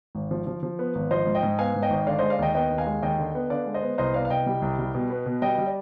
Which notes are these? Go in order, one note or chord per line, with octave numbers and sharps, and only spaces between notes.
G#1
F3
F3
F3
B3
G#1
F3 C5 D#5
G#2
D#5 G5
G#2
B3 F5 G#5
G#2
D#5 G5
G#1
D3 D5 F5
G#3 C5 D#5
D5 F5
D#2 D#5 G5
B3 D#5 G5
D#2
F5 G#5
G#3
D#2 D#5 G5
D3
B3
D3 D5 F5
G#3
C5 D#5
B3
C2 C5 D#5
B3 D5 F5
F5
C2 D#5 G5
G3
C2
G3
B2
B3
B2
G3 D#5 G5
G3
D5